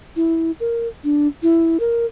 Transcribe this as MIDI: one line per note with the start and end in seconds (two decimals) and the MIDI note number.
0.16 0.51 64
0.60 0.88 70
1.04 1.27 62
1.43 1.78 64
1.80 2.06 70